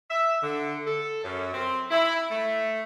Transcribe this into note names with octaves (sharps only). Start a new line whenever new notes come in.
E5
D3
A4
F#2
C4
E4
A3